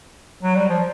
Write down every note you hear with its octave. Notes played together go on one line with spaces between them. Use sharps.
F#3
G3
F3